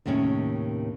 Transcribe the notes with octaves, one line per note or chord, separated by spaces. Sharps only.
D#2 A2 C3 D#3 C#4